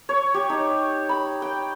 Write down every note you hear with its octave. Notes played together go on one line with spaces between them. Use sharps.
C#5
G4
D#4
B5
G5